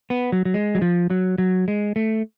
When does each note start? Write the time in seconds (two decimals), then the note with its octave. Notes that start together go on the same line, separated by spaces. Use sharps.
0.10 B3
0.32 F#3
0.45 F#3
0.54 G#3
0.75 F#3
0.82 F3
1.10 F#3
1.38 F#3
1.68 G#3
1.96 A3